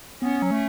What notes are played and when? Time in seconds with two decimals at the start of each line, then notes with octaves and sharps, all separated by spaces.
0.22 B3 C#4
0.42 F#3
0.51 A3